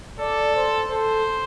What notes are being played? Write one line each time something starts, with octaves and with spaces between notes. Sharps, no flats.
A4 D5
C5
A4 C5